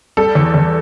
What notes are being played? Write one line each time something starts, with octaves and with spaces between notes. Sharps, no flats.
G3 A4
E2
E2